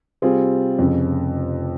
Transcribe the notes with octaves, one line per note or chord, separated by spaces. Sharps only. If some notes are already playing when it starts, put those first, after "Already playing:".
C3 G3 C4 F4 G#4
F1 F2 C#3